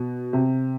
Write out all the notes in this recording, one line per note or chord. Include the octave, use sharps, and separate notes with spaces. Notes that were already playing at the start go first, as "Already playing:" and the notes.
Already playing: B2
C3